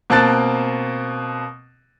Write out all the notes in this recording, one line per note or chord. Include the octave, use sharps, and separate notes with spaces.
B2 A#3 C4 A5 F#6 A6